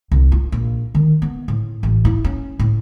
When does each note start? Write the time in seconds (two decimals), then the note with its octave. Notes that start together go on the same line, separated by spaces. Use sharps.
0.11 C2
0.32 F4
0.52 A#1
0.94 D#3
1.22 B3
1.48 A2
1.83 A1
2.05 E4
2.24 C#4
2.59 A2